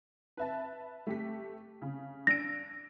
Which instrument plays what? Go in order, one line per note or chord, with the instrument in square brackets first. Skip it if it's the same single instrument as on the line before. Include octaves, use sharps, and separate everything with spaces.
[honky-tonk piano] B4 E5 A5
A3 G4 B6
C#3
[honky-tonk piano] D4 E6 D7 [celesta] A#6